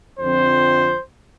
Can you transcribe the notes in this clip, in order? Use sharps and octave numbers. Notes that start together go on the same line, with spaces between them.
F2 D3 F3 C4 C5